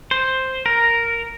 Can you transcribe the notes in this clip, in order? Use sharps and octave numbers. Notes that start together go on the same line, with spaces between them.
C5
A#4